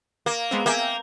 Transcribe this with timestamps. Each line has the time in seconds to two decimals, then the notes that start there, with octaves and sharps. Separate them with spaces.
0.26 A#3
0.51 G#3 B3 C4
0.66 A#3 E5 G5 G#5
0.79 G6